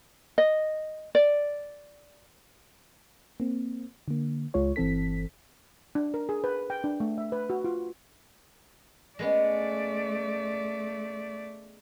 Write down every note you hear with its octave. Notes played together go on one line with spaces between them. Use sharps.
D#5
D5
A#3 C4
D3 A#3
C#2 G#3 F4 C#5
G1 E3 C4 A4 B6
D4
A#4
G#4
B4
G5
D4
A3
E5
B4
F#4
F4
G#3 A3 B3 C#4 D5